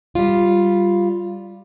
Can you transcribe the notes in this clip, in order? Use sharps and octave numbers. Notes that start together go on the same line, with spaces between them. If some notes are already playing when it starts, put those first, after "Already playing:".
G3 F4